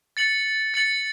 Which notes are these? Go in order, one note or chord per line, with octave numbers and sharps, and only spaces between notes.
A6 C#7 F#7
A6 C#7 F#7